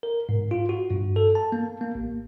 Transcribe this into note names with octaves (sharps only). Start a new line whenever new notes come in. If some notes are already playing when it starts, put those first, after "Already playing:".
A#4
G#2
F4
F#4
G2
A4
A5
A#3
A#3
A1